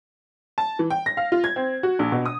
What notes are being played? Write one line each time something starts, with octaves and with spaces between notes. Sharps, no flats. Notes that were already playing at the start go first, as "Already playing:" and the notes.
A5
E3
G5
A#6
F5
F4
G#6
C4
F#4
A#1
B2
D#6